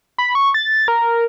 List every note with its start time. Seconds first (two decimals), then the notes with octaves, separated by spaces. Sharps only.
0.18 B5
0.35 C#6
0.54 A6
0.88 A#4